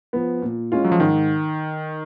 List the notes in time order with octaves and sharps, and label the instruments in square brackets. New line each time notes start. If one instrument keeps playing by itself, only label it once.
[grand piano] F3 B3
A#2
G#3 C#4 F4
[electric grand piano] F#3
F3
[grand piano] G#2 [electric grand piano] D#3